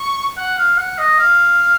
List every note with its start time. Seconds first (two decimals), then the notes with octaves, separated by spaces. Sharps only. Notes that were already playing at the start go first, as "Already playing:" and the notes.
Already playing: C#6
0.37 F#5
0.58 F5
0.78 F#5
0.98 D#5
1.19 F5